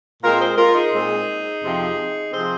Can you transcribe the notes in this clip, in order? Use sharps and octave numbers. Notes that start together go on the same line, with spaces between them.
A#2 G#3 C4 F4 A#4
G#4 C5
F4 A#4
D#4 G#4
A#2 G#3 C4
F2 C3 F3 C4
C3 F3 C4 G#4 C5